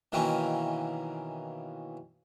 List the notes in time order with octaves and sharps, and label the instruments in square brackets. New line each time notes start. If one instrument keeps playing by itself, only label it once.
[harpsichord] B2 D#3 E3 A#3 C4 C#4